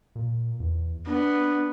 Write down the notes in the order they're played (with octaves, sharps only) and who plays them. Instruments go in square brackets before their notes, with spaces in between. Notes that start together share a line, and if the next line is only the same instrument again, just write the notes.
[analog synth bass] A#2
E2
[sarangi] B3 [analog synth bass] D4